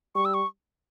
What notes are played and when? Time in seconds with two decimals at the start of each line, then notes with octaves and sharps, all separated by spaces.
0.15 G3 C#6
0.25 E6
0.34 C#6